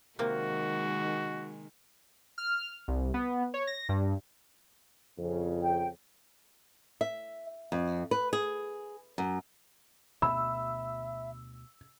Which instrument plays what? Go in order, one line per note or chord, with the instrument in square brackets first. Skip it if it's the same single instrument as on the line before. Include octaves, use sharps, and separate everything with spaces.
[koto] C3 A#3 [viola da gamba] D#3 G#3 [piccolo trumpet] F#4
[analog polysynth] F6
C2
B3
C#5
A#6
G2
[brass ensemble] F2 C#3
[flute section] G5
[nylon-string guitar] E5
F2
B4
G#4
F#2
[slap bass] D2 B2 A3 [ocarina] E5 [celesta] B5 [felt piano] E6